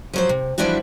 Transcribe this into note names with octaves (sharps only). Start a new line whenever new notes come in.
F3 F#3 C5
C3
E3 F3 G3 D4 E4 F#4